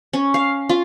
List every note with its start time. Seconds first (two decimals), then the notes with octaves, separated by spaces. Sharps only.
0.13 C#4
0.34 F5
0.69 F4